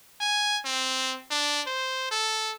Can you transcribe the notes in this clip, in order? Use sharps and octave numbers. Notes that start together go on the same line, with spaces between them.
G#5
C4
D4
C5
A4